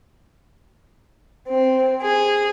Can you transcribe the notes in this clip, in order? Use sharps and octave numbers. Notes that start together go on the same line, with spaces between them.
C4
G#4